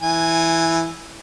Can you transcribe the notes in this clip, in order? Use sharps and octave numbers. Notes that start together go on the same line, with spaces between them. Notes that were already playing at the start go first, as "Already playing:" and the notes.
E3 G#5